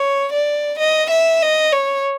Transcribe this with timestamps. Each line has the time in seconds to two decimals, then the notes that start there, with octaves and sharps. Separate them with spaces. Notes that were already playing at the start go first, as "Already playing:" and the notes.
Already playing: C#5
0.33 D5
0.79 D#5
1.11 E5
1.42 D#5
1.72 C#5